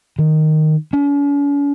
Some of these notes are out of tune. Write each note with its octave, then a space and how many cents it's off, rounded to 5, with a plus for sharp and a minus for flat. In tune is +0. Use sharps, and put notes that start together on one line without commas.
D#3 -5
C#4 +45